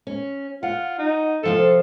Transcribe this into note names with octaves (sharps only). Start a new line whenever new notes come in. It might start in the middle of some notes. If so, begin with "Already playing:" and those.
C#4
F4 F#5
D#4
C3 F3 F4 A4